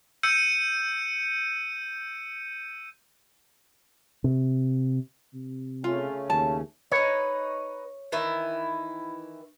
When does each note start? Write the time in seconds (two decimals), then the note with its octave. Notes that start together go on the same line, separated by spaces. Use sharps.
0.23 E6 G6 C#7 D#7
4.24 C3
5.34 C3
5.84 C#3 A3 C#4 F4
6.30 D#2 A5
6.92 D#4 B4 C#5
8.12 D#3 E3 E4